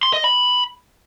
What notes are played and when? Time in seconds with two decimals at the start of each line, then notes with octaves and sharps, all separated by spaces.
0.03 C6
0.14 D#5
0.24 B5